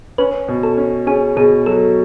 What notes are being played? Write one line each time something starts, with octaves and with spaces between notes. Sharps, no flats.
C#4 B4
B2
A4
C#4
C#4 G#4
B2 G#4
F#3 A4